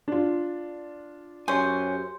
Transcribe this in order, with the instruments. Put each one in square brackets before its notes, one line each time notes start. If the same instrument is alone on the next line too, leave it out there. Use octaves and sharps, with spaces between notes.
[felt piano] D4 F4
[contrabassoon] F#2 [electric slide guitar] G4 C#5 G#5 [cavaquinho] C5